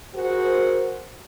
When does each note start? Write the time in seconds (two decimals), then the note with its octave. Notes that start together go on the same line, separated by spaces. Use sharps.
0.15 F#4 G#4 A#4 C5